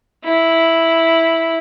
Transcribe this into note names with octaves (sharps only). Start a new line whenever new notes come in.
E4